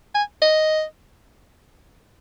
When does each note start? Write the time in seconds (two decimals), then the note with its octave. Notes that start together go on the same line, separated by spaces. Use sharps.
0.14 G#5
0.42 D#5